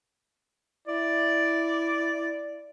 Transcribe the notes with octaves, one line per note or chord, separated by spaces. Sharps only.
E4 D5